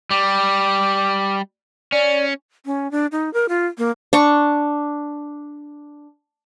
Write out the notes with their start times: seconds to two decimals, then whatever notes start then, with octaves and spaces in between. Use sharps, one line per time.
0.11 G3 D6
1.92 C#4 D5
2.66 C#4
2.91 D4
3.12 D#4
3.33 A#4
3.49 F4
3.78 A#3
4.13 D4 C#6